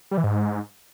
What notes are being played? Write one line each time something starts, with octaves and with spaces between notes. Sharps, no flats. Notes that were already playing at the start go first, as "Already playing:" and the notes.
G3
E3
G#2